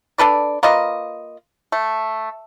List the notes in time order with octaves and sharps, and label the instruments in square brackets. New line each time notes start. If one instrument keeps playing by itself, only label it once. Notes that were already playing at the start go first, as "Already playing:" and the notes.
[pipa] D4 A4 B4 D5
A#3 F4 B4 D#5
A3